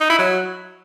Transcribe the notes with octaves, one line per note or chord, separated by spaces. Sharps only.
D#4
E4
F#3